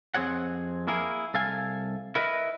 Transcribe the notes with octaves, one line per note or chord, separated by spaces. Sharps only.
F2 C4 G#4 C#5 F#5
A#3 E4 G#4 A#4
C2 A4 F5 G#5
E4 A#4 B4 D#5 E5